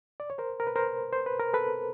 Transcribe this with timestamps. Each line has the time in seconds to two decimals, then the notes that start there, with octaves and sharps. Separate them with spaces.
0.20 D5
0.30 C#5
0.38 A#4 C5
0.60 A#4
0.67 B4
0.76 A#4 C5
1.13 C5
1.26 B4
1.39 A#4
1.54 A4 B4